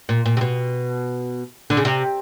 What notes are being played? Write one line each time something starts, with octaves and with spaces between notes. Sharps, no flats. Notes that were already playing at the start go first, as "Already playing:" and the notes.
A#2
A#2
C3
B2
D3
C#3
C3